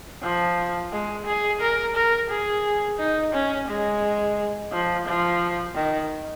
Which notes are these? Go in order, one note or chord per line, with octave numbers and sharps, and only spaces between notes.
F3
G#3
G#4
A#4
A#4
G#4
D#4
C#4
G#3
F3
F3
D#3